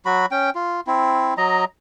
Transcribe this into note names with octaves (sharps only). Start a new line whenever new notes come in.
F#3 F#4 B5
C#4 G5
F4
C4 E4
F#3 D#5 A#5